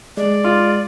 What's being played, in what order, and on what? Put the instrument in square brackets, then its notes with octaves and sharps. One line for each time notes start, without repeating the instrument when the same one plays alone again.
[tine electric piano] G#3 [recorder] D5
[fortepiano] F4